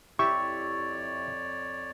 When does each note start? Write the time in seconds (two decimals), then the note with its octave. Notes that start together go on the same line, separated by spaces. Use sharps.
0.19 F2 E4 G4 C#5 D5 E5 C#6